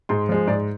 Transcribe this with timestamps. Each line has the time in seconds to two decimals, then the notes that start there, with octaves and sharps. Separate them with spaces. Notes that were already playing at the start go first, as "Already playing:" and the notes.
0.09 G#2 C6
0.29 F3 G#3
0.47 G#2 D5